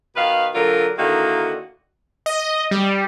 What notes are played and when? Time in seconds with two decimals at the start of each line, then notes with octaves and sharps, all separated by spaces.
0.17 B2 D#3 B4 F5
0.55 D3 F#3 F4 A#4
0.99 D3 D#3 A#3 E4 F#4
2.26 D#5
2.71 G3